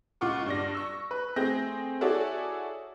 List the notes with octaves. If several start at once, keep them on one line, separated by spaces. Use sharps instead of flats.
C#2 F4 F#5 C#6 D6
G2 D5 A#6
C#6 E6
B4
A3 C4 G#4 G6 A#6
E4 F#4 G#4 A4 C#5 D5